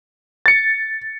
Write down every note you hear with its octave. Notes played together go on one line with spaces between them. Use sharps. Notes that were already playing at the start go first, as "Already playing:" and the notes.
A6 C#7